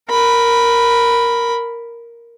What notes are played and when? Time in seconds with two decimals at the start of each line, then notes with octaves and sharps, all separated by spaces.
0.10 A#4 B5